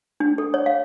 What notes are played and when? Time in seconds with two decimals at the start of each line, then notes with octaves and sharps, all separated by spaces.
0.20 D4
0.38 A4
0.54 C#5
0.66 F5